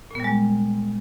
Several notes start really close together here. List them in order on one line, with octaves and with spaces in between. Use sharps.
A#2 B3 G3 G#3